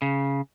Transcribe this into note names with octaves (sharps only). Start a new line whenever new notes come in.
C#3